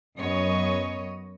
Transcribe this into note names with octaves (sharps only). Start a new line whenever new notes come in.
F#2 B3 C#5 D#5